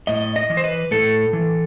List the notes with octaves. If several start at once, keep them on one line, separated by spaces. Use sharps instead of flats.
A2 D#5
D#5
E3
C5
B4
A2 A4
E3